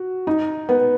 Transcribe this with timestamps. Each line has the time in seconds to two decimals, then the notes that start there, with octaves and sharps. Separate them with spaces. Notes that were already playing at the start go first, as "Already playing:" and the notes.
Already playing: F#4
0.27 D#4
0.69 B3